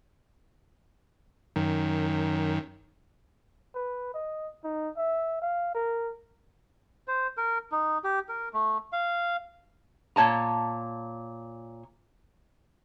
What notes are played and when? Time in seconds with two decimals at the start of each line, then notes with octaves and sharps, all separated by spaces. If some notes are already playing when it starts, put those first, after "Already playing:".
1.56 F#2 D#3
3.75 B4
4.14 D#5
4.64 D#4
4.97 E5
5.42 F5
5.74 A#4
7.08 C5
7.37 A#4
7.72 D#4
8.04 G4
8.29 A#4
8.54 A3
8.93 F5
10.16 A#2 C#5 A5 A#5